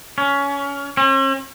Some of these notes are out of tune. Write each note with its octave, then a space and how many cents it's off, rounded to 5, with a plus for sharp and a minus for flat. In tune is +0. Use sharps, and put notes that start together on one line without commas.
C#4 +20
C#4 -45